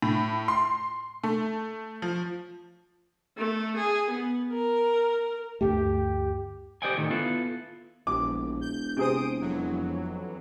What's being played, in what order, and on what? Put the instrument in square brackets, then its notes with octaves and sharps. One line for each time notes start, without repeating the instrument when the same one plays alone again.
[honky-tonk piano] A2
C6
A3
F3
[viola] A3
G#4
B3
A#4
[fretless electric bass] D2 G2 A3 [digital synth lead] G4
[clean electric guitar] G4 C5 D5 D#5 G5 G#5
A2 D3 D#3 A3
B3 E4 F4 A4
[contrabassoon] E1 [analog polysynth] A#1 [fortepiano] D6
[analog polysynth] G6
[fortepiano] C3 G#4 C5 [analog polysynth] D#6 D7
[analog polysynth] F2 E3 F#3